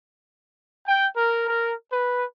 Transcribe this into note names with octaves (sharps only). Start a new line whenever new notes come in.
G5
A#4
A#4
B4